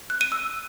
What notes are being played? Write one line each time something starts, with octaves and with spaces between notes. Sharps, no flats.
F#6
D#7
E6